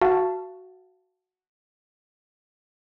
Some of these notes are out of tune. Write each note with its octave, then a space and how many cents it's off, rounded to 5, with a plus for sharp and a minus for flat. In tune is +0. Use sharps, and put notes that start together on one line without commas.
F#4 +0 F5 -35 A5 +0